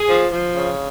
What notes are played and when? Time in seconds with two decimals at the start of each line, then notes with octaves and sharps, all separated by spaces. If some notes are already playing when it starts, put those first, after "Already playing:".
Already playing: G#4
0.09 F3
0.32 F3
0.55 C#3